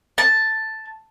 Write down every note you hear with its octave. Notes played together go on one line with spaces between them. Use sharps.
A5